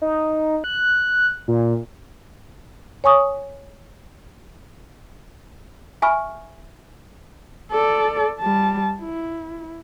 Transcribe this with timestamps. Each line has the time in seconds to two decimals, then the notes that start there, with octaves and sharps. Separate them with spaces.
0.02 D#4
0.64 F#6
1.48 A#2
3.04 C#5 G#5 C#6 D#6
6.02 E5 G#5 B5 C#6 F6
7.71 A4 D5
8.40 G3 A5
8.99 E4